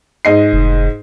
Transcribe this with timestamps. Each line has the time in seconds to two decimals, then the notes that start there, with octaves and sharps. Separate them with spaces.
0.25 G#2 D#5 C7
0.52 F1